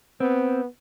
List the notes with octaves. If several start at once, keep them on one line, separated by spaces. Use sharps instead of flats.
B3 C4